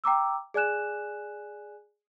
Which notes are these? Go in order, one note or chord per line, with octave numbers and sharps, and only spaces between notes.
G5 A#5 D6 E6
G#4 D5 G#5 F#6 E7